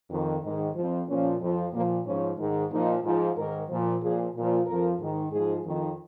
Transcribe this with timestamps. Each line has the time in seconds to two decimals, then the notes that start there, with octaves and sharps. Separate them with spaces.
0.10 F2 D#3
0.43 G#2 D#3 D#4
0.75 F2 F3
1.08 A#2 F3 C#4
1.41 F2 F3
1.73 A#2 F3 A#3
2.06 G#2 F3 C#4
2.38 G#2 D#3
2.71 A#2 F3 D#4
3.04 G#2 F3
3.37 G#2 D#3 A#4
3.69 A#2 F3
4.02 A#2 F3 G#4
4.34 A#2 F3
4.67 F2 F3 A#4
4.99 G#2 D#3
5.32 G#2 F3 G#4
5.65 F2 D#3